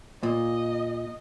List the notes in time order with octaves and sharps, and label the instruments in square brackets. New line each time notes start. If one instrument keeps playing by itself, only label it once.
[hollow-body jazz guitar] A#2 [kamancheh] D#5